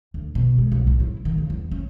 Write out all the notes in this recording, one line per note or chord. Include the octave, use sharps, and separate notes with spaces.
D2
B2
G#3
B1
A2
E4
D#3
C#3
E2
C#4